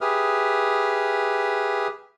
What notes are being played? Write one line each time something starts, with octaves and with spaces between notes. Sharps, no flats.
G4 G#4 B4 E5 D#6 F6